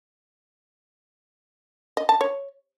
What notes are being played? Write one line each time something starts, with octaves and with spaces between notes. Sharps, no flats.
D#5
A5
C#5